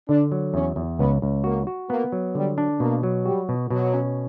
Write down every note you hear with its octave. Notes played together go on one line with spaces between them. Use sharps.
D3 D4
F#3
E2 C#4
E2
C#2 B3
C#2
A#3 F#4
F#4
A#3 B3
F#3
D3 G3
D4
B2 A#3
F#3
G3 F#4
B2
B2 F#3
C#4